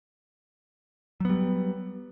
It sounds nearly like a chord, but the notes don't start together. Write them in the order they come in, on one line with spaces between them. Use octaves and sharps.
F#3 B3 G3